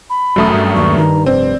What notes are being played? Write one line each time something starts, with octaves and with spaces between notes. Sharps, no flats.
B5
E1 F#2 A3 D#6
G2
D#2 C#6
D#3 A#5
F1 C4 D5